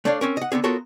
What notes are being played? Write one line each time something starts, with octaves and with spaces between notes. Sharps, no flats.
A3 D4 C#5 D5 F5
C4 C#4 A#4
D#5 F#5
D3 B3 C4 G#4
B3 F4 F#4 A4 A#4 C#5